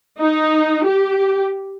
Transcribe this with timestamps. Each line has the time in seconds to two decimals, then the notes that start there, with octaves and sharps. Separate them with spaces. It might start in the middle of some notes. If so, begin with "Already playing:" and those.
0.20 D#4
0.88 G4